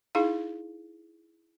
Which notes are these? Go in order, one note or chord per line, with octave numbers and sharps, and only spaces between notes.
D#4 E4 G#4 F5